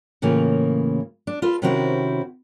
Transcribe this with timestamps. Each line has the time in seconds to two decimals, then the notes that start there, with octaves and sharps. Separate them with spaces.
0.22 A2 C#3 E3 A#3 F4
1.27 D4
1.42 F4 A4 B4
1.62 C3 D#3 C4 C#4 E4 F#4